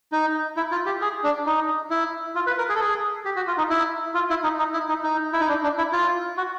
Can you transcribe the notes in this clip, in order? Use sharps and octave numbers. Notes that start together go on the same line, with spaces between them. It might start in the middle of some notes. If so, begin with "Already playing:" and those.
D#4
E4
F4
G4
G#4
D4
D#4
E4
F4
B4
A#4
G#4
A4
G#4
G4
F#4
F4
D#4
E4
F4
E4
D#4
D#4
E4
D#4
D#4
E4
D#4
D4
D4
E4
F4
F#4